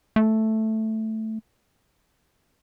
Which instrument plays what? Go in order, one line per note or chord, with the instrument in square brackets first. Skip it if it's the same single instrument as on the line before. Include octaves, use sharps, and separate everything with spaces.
[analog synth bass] A3